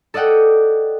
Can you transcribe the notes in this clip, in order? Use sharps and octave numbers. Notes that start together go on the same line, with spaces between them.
A4 D5 D#5 F#5 G5